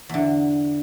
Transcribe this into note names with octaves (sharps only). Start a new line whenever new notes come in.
E2 D3